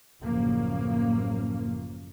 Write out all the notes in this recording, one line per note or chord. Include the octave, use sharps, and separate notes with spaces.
A1 F#2 A2 C#3 F3 A#3